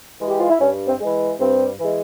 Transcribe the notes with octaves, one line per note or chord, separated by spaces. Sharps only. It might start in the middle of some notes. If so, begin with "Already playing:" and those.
E3 G#3
G4
F4
E4
G2 C#4
C4
E3 G#3
G2 C4
E3 G#3